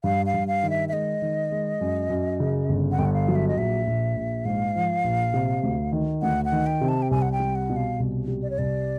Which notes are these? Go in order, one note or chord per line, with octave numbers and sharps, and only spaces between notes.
G2 F5
F5
G2
F5
D#3
E5
E5
G#3 D#5
D#3
G#3
F#2
F#2
C#3
G1
F#5
G1 G5
F#5
F5
F#3
E5
D#5
A#1 E5
A#1
A#1
G#2 F5
F3
A#1
C3
D2
D#3
D2 F#5
F#5
D#3
G5
C3
A5
G5
C2 G#5
F#5
G5
G3
F#5
B2
F5
C2
G3
D5
C#5
C2 D5